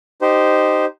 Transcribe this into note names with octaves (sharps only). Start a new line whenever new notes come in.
D#4 G4 C5